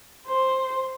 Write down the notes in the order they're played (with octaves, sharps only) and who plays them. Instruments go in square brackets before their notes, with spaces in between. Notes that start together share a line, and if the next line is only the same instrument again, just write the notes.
[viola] C5